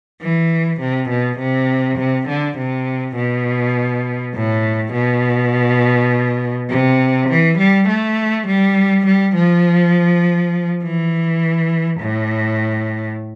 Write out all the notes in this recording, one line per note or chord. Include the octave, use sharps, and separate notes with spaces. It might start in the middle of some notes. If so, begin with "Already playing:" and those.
E3
C3
B2
C3
C3
D3
C3
B2
A2
B2
C3
E3
G3
A3
G3
G3
F3
E3
A2